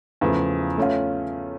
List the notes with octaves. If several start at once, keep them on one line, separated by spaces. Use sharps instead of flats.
E2 C#3 F3 A3
A3 C#4 F4